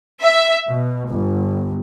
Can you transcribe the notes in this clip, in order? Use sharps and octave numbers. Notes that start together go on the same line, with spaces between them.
E5
B2
G1